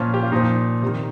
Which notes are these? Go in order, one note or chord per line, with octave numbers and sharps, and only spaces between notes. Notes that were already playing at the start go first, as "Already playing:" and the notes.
Already playing: A#2 F3 C#4
G4
F4
A#2 F3 D#4
C3 D#3